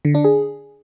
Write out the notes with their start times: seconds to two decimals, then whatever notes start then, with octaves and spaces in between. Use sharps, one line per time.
0.05 D3
0.15 D4
0.24 G#4